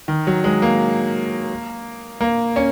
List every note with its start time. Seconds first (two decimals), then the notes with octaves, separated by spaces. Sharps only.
0.08 D#3
0.27 F#3
0.44 G#3
0.62 A#3
2.21 A#3
2.56 C#4